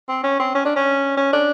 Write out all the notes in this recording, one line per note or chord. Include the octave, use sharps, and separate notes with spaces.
C4
C#4
C4
C#4
D4
C#4
C#4
D4